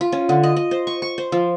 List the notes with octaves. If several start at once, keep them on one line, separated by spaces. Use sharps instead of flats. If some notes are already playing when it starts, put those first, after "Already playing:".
F4
C#4
D3
D#5
D#5
C5
C#6
C#6
C5
F3